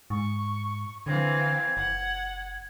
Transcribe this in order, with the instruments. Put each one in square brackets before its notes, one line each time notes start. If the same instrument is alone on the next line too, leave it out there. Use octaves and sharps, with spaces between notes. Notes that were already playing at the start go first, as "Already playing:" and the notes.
[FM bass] G#2 [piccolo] C#6
[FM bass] D3 [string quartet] E3 C4 F5 [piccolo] G#6
[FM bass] F#1 [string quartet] F#5